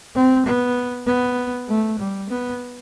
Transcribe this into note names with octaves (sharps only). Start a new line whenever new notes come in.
C4
B3
B3
A3
G3
B3